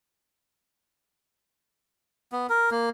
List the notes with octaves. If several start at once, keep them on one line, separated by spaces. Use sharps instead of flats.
B3
A#4
A#3